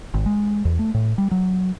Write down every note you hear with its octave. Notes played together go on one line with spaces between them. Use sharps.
G#1
G#3
E2
A3
A2
G3
F#3